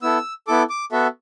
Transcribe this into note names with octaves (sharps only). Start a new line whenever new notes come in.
B3 E4 A4 E6
B3 E4 A4 D6
D6
B3 F#4 A4 E5